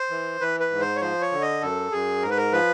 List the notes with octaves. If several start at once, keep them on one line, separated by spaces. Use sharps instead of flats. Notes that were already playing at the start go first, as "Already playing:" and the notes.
Already playing: C5
E3
E3 B4
B4
G#2
C5
C#5
F3 C5
C#5
D3
D#5
F#2 A4
F#2 G#4
G#2 A#4
B4
A#4
F3 B4